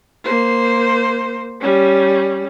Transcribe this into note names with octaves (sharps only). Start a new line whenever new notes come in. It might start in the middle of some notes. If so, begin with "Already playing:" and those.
A#3 C5
G3 C#4